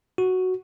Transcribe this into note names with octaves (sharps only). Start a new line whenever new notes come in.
F#4